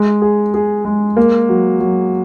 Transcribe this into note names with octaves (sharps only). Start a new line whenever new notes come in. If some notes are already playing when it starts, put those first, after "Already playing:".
Already playing: G#3
G#4
G#4
G#3
A#3
F#3
F#3